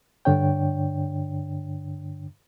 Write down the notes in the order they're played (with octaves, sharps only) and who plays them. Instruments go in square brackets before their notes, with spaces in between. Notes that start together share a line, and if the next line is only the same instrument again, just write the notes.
[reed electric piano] G2 D3 D4 C#5 G5